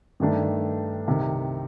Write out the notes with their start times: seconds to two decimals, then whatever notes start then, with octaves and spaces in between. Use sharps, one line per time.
0.20 G2 D#3 A3 D4
1.08 C2 C3 D#3